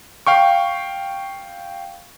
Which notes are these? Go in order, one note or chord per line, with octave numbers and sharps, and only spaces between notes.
F5 G5 C#6